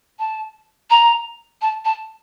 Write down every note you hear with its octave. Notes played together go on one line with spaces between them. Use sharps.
A5
A#5
A5
A5